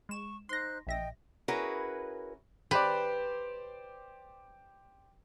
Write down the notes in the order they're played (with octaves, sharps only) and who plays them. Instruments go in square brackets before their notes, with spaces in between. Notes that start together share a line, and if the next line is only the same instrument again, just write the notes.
[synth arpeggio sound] G#3 E7 [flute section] C#6
[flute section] D#4 C5 F#6 [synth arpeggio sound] C6 A#6
[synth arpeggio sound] A#1 E5 A#6 [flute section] D#5 G5
[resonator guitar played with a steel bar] C#4 E4 F#4 G#4 A#4 B4
[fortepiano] G4 C5 D5 [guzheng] B4